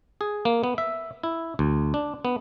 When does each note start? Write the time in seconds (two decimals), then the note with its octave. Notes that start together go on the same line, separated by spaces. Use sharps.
0.21 G#4
0.45 A#3
0.64 B3
0.78 E5
1.24 E4
1.59 D2
1.94 D4
2.25 B3